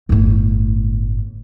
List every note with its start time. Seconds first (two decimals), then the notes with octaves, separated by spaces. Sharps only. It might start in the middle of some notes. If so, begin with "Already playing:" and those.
0.09 G1 A2